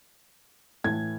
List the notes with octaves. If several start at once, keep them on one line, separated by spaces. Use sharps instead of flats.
A2 E3 A3 G#6